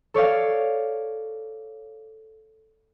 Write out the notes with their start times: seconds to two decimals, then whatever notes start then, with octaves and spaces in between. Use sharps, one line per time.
0.14 A4 C#5 D5 F5